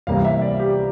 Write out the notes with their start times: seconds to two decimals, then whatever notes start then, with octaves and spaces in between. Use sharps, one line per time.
0.07 E2 C3 G3 A#3 F5
0.25 E5
0.42 D5
0.60 G4